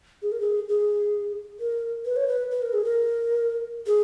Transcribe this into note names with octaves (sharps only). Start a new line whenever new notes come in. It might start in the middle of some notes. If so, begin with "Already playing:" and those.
G#4
A#4
G#4
G#4
A#4
B4
C#5
B4
B4
A#4
G#4
A#4
G#4